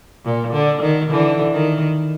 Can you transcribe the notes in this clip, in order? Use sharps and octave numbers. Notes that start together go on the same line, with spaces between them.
A#2
D3
D#3
D3 E3
D#3